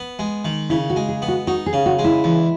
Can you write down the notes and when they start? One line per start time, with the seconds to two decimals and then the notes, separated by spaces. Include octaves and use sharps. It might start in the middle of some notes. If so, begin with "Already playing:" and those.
Already playing: B3
0.19 G#3
0.45 D#3
0.70 C#3 E4
0.90 F#4
0.96 G#3
1.08 G#4
1.22 B3
1.28 F#4
1.47 D#4 F#4
1.66 G#4
1.73 C#3
1.86 F#4
1.99 G#3
2.04 E4
2.24 E2